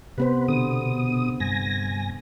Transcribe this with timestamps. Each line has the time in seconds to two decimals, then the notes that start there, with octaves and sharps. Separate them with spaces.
0.18 C3 B3 B4 C5
0.48 B2 D3 D#6
1.40 G2 G#5 A#6